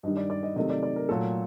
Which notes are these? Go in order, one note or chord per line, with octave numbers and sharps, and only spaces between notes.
G2 D#3 G3 D#5
D5
D5
D#5
C3 D#3 F#3 A3 D#5
D5
D5
A#4
A#2 F#3 A3 A4